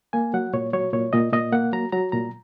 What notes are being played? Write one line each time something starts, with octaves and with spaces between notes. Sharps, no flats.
A#3 G#5
F#3 F#5
A#2 C#5
F#3 C#5
A#2 C#5
A#2 D#5
A#2 D#5
A#3 F#5
F#3 A#5
F#3 A#5
A#2 A#5